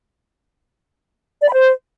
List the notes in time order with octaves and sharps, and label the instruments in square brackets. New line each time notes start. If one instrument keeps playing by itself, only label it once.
[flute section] D5
B5
C5